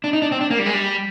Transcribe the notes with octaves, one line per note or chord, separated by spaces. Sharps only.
D4
D#4
D4
C4
D4
A#3
G3
G#3
G3